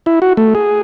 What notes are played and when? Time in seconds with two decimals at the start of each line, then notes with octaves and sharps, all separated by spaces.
0.06 E4
0.22 F#4
0.37 A3
0.55 G#4